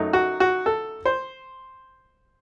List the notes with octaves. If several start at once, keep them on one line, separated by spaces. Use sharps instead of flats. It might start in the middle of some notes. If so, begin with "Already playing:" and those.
Already playing: F#2 F#3 A3 D#4
F#4
F#4
A4
C5